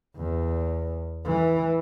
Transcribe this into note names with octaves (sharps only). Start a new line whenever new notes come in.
E2
E3